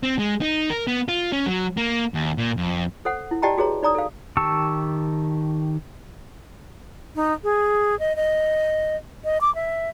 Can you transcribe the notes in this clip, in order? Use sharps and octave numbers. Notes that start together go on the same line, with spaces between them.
C4
G#3
D#4
A#4
B3
F4
C#4
F#3
A#3
D#2
A#2
F2
A4 C5 F#5
E4
G4 D5 D#5 G5 A5 A#5
F#4 G#4 B4 C#5 A#5
D#4 D5 A#5 D#6
A4 F5
D#3 G4 A5 C#6 E6
D#4
G#4
D#5
D#5
D#5
D6
E5